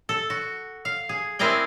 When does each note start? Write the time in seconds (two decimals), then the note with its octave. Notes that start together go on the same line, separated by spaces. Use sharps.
0.09 A4
0.30 F#4
0.85 F5
1.09 G#4
1.39 C4 E4 G#4 A#4 D5 G5